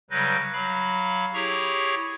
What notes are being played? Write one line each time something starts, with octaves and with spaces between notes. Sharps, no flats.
C#3 F#3 G3 B4 G6 A#6
F#3 F5 B5
E4 G4 G#4 C#5 A#5 C#6